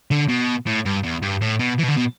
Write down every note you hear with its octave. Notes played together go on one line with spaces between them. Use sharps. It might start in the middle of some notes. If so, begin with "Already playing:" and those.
D3
B2
A2
G2
E2
G2
A2
B2
E3
B2
D3
B2